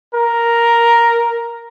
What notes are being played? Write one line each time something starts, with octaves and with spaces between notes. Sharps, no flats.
A#4